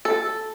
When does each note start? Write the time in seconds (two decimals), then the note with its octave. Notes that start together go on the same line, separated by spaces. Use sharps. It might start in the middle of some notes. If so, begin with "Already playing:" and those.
0.05 A4